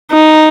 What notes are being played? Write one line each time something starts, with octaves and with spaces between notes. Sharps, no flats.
D#4